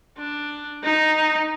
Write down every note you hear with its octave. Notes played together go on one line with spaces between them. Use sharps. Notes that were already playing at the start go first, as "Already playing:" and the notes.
D4
D#4